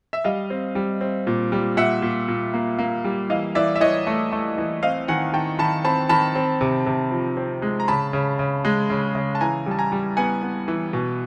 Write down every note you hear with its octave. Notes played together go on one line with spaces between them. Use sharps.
E5
G3 D#5 F5
C4
G3
C4
A#2
G3
A#2 E5 F#5
A#2
A#2
A#3
A#3
G3
E3 D#5 F5
E3 D5 E5
E5
E3 C#5 D#5
A3
A3
E3
C4 D#5 F5
D#3 F#5 G#5
D#3 G5 A5
D#3 A5 B5
C4 A5 B5
D#3 A5 B5
C4
C3
C3
F3
C4
G#3
A#5
C#3 A5 B5
C#3
C#3
G#3
C#3
C#3
A5
E3 G#5 A#5
G3 A5
G#5 A#5
G3
B3 F#5 G#5
B3
E3
B2